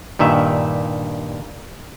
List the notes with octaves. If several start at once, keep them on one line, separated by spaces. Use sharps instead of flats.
G2 A#2 D#3 E5